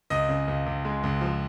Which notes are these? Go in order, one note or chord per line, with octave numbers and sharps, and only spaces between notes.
C#2 D#5
C#3
C#2
C#2
G#3
C#2
F3